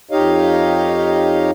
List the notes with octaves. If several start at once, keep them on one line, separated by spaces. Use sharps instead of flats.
F2 D#4 G4 C#5 D#5 F5